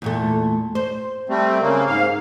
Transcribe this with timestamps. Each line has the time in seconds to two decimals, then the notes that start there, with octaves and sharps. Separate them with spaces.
0.02 E2 A#2 A3
0.75 C5
1.29 G3 A3 C4
1.61 C#3 A#3
1.87 G#2 F5